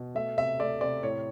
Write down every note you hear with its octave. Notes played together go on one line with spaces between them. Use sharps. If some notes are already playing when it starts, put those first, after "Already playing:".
Already playing: B2
A3 E5
C3 E5
A3 D5
C3 D5
A2 C#5